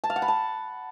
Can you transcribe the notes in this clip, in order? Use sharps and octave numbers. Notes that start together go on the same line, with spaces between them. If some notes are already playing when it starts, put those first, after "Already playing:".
A5
F5
F#5
B5
A5